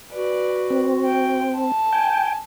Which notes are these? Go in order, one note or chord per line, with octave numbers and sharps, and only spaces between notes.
F#4 B4 D5
C4
G5
A5
G5 G#5